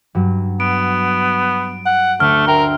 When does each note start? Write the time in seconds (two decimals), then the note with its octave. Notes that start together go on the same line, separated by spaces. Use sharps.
0.15 G2 F#3
0.60 B3 D7
1.86 F#5
2.20 D2 A3 F6 C#7
2.48 A#4 E5 G5 C6